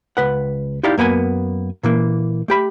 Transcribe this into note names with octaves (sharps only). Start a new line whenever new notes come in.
C#2 B4 F#5
D#4 E4 G4 D5 F5
F#2 A#3 B3 G#5
A#2 E3 A#3
A3 G4 B5